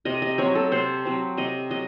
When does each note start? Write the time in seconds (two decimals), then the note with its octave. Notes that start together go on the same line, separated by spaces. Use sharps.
0.05 C3 D#5
0.22 D#5
0.38 F#3 C4 C#5
0.55 A4
0.72 C3 C5
1.05 F#3 C4
1.37 C3 D#5
1.71 F#3 D#5